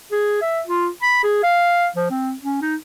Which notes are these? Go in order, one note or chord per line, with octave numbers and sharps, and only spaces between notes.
G#4
E5
F4
B5
G#4
F5
F3
C4
C#4
D#4